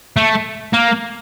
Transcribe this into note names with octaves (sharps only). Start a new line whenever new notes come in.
A3
A#3